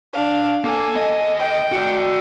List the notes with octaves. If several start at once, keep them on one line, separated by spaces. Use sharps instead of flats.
D4 F5
A#3 A4 G#5
D#2 D#5
G5
F#4 D5